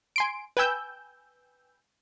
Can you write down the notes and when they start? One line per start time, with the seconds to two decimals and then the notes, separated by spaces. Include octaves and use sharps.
0.16 G#5 C6 D7
0.57 B4 G5 G#5 E6 G6